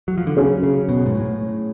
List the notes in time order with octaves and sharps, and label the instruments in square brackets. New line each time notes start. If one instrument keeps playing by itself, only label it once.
[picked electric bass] F#3
F3
D3
[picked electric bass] C#3 [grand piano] F#3 C#4 G#4
[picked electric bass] C#3
B2
G#2
A2